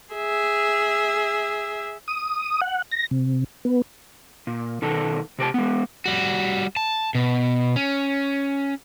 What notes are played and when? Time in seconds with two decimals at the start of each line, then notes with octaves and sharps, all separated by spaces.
0.14 G#4 E5
2.08 D#6
2.61 F#5
2.92 A#6
3.11 C3
3.65 B3
4.47 A#2
4.82 B2 D#3 A4
5.39 C3 G4 A#4 A5
5.54 G#3 B3
6.06 G3 F#4
6.76 A5
7.15 B2
7.76 C#4